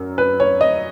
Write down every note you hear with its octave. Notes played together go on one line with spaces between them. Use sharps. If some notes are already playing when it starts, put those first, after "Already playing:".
Already playing: F#2 A#4
B4
C#5
D#5